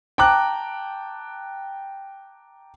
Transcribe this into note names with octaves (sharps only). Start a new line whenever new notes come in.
G5 A5 A#5 D6 F#6